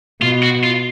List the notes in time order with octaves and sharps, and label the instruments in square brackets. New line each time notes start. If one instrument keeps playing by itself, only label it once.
[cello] B2 [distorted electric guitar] F4
[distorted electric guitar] F#4
F4